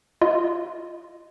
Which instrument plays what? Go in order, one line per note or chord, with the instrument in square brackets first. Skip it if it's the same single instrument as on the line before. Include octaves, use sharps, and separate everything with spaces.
[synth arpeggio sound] F4 D#5